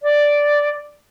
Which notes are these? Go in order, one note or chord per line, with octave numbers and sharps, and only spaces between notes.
D5